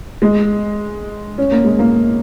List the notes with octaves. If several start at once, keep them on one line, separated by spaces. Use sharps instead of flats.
G#3
C#4
A#3
G#3
A#3